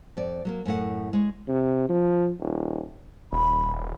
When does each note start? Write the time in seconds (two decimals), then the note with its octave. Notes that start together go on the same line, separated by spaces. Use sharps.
0.17 F2 D5
0.45 F#3 A3 A#3
0.65 F#2 A2 A3 F#5
1.13 G#3 C#5
1.48 C3
1.89 F3
2.40 D#1
3.32 D#1 B5